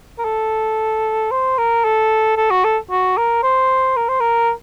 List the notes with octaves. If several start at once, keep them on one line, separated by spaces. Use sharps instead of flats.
A#4
A4
C5
A#4
A4
A4
F#4
A4
F#4
A#4
C5
A#4
C5
A#4